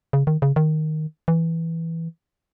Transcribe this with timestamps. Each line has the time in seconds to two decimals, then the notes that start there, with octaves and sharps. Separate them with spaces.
0.13 C#3
0.27 D#3
0.42 C#3
0.56 D#3
1.28 E3